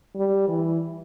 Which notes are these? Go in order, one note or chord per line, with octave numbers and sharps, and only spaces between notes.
G3
E3